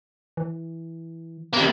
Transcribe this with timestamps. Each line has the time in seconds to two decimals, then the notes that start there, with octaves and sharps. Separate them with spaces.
0.37 E3
1.53 G3 A#3